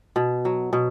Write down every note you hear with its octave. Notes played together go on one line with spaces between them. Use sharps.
B2
F#3
B2